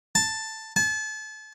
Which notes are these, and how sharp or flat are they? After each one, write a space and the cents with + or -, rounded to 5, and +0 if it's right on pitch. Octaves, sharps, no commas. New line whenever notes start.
A5 +5
A5 -35